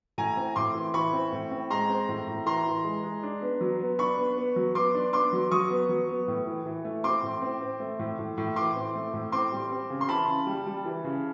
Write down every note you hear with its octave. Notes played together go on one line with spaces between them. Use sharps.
A2 G#5 A#5
C4
A2 C6 D6
E3
E3 B5 C#6
C4
A2
C4
G#3 A#5 C6
C4
A2
A2
E3 A#5 C6
E3
G#3
G#3
D4
B3
F#3
B3
D4 B5 C#6
B3
B3
F#3
B3 C6 D6
D4
B3 C6 D6
F#3
F#3 C#6 D#6
B3
F#3
B3
A2
E3
E3
A3
C4 C6 D6
A2
C4
C4
A3
A2
A2
A2
E3 C6 D6
C4
A3
A2
C4 C6 D6
G3
C4
C#3
C6
E3 A5 B5
C#3
G3
G3
E3
C#3